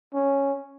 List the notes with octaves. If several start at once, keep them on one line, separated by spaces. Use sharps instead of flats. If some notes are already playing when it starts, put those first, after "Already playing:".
C#4